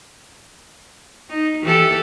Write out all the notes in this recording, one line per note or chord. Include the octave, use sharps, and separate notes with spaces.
D#4
E3 G4 A4